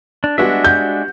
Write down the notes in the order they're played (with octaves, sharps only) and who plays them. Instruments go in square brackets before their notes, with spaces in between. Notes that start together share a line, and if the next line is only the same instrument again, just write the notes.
[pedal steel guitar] D4
[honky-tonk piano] G3 B3 F#4 [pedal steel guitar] G#3 D4 E5
[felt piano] G6